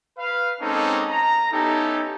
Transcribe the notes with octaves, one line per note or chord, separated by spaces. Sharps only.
B4 F5
G#3 A#3 C4 C#4 D#4 A4
A#5
B3 C#4 D#4 E4 G4 A4